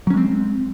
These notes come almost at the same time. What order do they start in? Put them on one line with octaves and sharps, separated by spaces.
F#3 C#4 G#3 C4